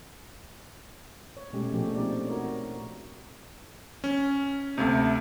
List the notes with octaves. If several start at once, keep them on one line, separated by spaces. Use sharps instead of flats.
C#5
B2 G#3 A3 C#4 G4
A#2 F3 A3 D4 G4
C4 D#4 G4 D5
F#4 A#4 C#5
C#4
D2 C3